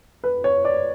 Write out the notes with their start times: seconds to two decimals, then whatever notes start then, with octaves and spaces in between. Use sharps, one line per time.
0.24 B4
0.44 C#5
0.65 D5